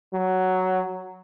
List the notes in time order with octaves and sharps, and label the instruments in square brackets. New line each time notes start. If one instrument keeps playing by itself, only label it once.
[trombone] F#3